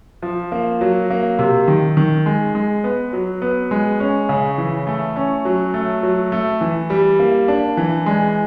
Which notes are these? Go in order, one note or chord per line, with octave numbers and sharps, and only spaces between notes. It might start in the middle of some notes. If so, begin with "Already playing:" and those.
F3
A#3
F#3
A#3
C3
D#3
D#3
G#3
G#3
B3
F#3
B3
G#3
C#4
C#3
E3
A3
C#4
F#3
A3
F#3
A3
E3
G3
A#3
D4
E3
G#3